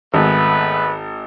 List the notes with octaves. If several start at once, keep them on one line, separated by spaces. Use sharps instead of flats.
G#1 A3 B3 B4